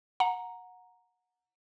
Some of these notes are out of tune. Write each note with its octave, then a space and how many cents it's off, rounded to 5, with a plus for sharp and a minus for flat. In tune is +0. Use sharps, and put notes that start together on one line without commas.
F#5 -20 A#5 +0